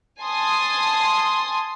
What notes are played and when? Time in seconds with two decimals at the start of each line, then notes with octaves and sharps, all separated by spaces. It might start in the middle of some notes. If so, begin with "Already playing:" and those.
0.21 G#5 A5 C6 D#6